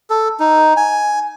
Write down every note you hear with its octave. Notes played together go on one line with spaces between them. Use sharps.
A4
D#4
G#5